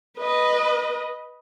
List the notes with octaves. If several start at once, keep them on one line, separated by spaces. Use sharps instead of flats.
B4 D#5